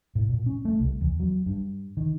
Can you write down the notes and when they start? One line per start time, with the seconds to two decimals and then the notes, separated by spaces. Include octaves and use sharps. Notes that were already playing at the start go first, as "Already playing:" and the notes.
0.15 A2
0.29 A#2
0.46 C#4
0.65 A3
0.80 C2
1.01 E2
1.20 F#3
1.46 G2
1.97 D#3